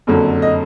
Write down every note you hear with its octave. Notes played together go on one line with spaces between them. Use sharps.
F#1 F2 D3 F#3
D#5